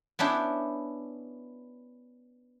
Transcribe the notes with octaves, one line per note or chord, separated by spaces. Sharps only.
B3 C#4 D4 E4 G4